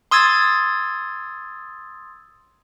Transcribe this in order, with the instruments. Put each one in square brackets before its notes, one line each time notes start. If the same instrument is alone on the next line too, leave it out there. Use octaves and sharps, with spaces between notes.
[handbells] C6 D#6 E6 G#6 A6